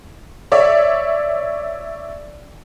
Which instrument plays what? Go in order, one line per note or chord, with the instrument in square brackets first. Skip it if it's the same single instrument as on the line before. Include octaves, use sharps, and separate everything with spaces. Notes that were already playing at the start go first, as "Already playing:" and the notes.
[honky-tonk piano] C#5 D5 E5